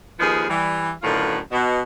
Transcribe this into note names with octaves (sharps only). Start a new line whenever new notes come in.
D#2 F3 G#4 A#4 B4 D#5
E3 G3
F#2 A2 D3 D#3 F4 B4
B2